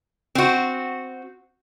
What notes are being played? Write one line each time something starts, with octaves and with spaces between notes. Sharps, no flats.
C4 F#4